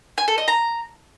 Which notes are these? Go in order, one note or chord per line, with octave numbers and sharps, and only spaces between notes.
G#5
A4
D#5
A#5